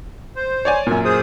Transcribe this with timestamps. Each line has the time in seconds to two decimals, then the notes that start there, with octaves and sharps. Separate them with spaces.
0.36 C5
0.65 C#5 D5 G#5
0.87 F#2 A#2 G#5
1.05 G#4 C5 D#6